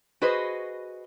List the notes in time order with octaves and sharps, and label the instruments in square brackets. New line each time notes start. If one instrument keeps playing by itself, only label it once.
[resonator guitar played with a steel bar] F#4 G#4 B4 C5 D#5